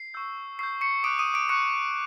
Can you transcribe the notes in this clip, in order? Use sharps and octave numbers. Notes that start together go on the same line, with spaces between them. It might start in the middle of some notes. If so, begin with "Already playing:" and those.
Already playing: C7
C#6 E6 G6
C#6 E6 G6 C7
C#6 C#7
D6 D#6 F#6 D7
D#6 D#7
D6 D7
C#6 D#6 F#6 C#7